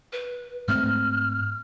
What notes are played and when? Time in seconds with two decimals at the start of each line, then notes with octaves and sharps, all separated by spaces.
0.12 B4
0.68 G#2 A3 C4 F6